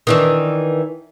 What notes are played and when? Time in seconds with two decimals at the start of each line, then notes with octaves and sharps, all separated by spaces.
0.07 D#3 E3 D4